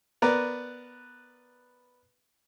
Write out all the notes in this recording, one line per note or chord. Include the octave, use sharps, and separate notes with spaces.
B3 A#4 B4 D5